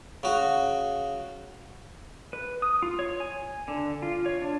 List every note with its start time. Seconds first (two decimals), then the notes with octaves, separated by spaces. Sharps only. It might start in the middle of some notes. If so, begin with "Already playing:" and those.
0.23 C#3 F#4
2.33 B4
2.62 D#6
2.82 F4
2.99 C#5
3.20 G#5
3.68 D3
4.02 F4
4.26 C#5
4.42 D4